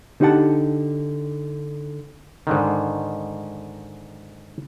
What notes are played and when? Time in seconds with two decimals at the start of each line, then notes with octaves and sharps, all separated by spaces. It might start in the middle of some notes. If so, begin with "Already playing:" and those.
0.20 D3 D#4 G4 B4 F#5 A5
2.47 G#2 D3 D#3